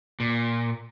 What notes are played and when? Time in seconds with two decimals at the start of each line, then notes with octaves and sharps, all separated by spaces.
0.20 A#2